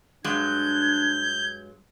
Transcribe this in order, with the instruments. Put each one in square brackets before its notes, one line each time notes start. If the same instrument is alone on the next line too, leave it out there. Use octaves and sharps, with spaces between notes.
[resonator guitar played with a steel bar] G2 F#3 G#3 [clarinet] D4 [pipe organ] G6 [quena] G#6